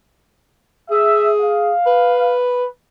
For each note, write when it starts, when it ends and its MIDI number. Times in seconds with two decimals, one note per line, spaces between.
0.91 1.73 68
0.91 1.30 76
1.40 2.41 77
1.86 2.66 71